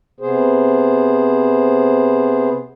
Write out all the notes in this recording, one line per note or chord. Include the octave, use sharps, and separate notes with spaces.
C3 B3 G#4 C5